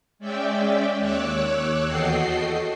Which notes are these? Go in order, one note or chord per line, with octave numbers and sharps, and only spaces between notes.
G#3 C#4 D5 E5 G5
D#2 C#5 D6 E6 F#6
E2 F#4 A4 D#5 G5 C7